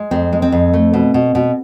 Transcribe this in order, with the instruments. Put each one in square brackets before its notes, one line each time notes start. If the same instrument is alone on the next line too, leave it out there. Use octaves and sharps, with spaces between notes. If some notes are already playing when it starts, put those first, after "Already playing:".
Already playing: [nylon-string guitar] G#3
F2 C4
G#3
C4
F2
A3
B2
B2
B2